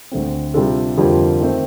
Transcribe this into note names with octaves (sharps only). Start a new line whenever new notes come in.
D2 D3 A3 C4
C3 G3 D4 F4 A4
F2 D3 G3 A#3 F4
D#3 A3 C4